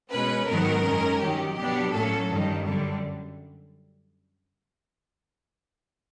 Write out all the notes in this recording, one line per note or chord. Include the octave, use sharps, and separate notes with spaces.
B2 G#3 C#4 B4
G#2 D#3 F#3 B3 A#4
F#2 D#3 G#3 C#4
G2 D#3 F#3 G4
B2 F#3 B3 D4 G4
A2 F#3 A#3 C#4 A4
G2 D#3 G3
F#2 D3 G3